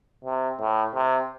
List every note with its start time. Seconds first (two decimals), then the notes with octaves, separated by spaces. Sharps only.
0.24 C3
0.60 A2
0.95 C3